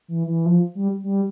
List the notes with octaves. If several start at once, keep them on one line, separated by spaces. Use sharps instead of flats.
E3
E3
F3
G3
G3